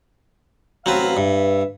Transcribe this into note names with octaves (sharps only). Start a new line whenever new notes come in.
A1 F#3 C4 B4 F5
G2 B4 E5